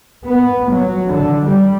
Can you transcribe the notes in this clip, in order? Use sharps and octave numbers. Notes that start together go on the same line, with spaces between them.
B3
F#3
D3
G3